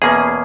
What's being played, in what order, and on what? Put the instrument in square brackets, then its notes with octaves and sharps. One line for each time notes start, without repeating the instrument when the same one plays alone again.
[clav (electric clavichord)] E2 B2 A#3 C#4 G#4